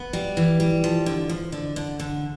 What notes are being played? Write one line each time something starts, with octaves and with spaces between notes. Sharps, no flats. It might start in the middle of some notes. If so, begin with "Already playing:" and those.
Already playing: B3
G3
E3
G3
F3
D3
F3
D3
D3
D3